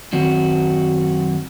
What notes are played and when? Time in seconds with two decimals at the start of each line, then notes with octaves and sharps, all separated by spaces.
0.13 F#2 D#3 F#3 C4 F#4